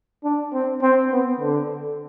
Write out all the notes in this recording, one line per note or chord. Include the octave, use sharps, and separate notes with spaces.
D4
C4
C4
B3
D3